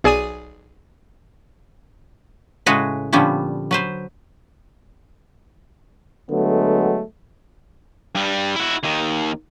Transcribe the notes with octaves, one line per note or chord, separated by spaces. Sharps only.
B1 G#4 D5 G#5 D#6 D#7
A2 C#3 G#3 F#4 G#4 B4
A#2 D3 F3 G3 B3 C#4
F#3 B4 C5
D3 F#3 G#3 A3 B3
G2 G3
E4 F#4
D#2 D#3